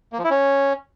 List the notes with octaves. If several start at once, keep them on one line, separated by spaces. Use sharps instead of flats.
A#3
F3
E4
C#4